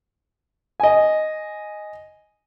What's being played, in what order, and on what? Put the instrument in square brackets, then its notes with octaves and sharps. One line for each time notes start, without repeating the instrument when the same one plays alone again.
[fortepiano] D#5 G#5